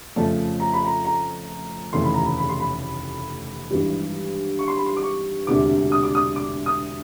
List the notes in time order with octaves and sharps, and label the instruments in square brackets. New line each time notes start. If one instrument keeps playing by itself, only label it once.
[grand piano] F2 C#3 F3 A3 A5
A#5
B5
A#5
A#5
F1 D#2 C#3 E3 A3 C6
B5
A#5
B5
B5
C6
B5
G#1 G2 E3 G3
C#6
C6
B5
C6
D6
C#6
E1 D2 C3 D6
D#6
D6
D#6
D6
D#6